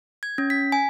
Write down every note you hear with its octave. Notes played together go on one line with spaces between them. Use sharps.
G#6
C#4
B6
G#5